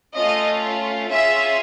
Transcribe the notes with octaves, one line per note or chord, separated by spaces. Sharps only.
A3 C#4 F4 D#5
C#4 F4 G#4 E5